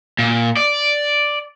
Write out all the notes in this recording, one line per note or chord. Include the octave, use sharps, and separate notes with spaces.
A#2
D5